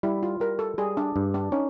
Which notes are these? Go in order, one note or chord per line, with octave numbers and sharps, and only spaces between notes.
G3 E4
F4
G3 A#4
A4
G3 G#4
D4
G2
D4
C#4 D#4